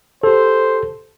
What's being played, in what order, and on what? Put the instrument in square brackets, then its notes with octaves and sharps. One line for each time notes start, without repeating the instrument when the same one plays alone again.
[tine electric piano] G4 A4 [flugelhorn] C5